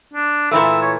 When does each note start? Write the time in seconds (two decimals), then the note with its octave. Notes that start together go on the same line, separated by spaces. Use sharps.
0.13 D4
0.51 A#2 E3 A3 E6
0.82 C#5